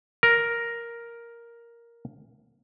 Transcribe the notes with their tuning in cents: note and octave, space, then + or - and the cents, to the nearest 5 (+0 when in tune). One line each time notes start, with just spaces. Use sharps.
A#4 +5